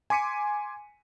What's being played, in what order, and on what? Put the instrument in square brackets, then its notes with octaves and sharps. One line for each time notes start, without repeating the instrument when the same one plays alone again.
[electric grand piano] G#5 C6 D6 B6 C#7 D#7